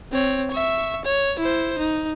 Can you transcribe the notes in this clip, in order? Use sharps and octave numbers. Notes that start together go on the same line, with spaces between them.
C4 C#5
E5 C#6
C#5
E4 C5
D#4